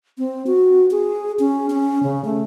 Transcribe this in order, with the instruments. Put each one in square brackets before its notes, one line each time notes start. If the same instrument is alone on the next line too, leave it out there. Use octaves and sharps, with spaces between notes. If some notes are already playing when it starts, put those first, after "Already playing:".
[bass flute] C4
F#4
G#4
C#4
C#4
C#3
A3